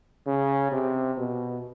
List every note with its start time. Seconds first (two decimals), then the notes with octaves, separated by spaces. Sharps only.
0.27 C#3
0.72 C3
1.17 B2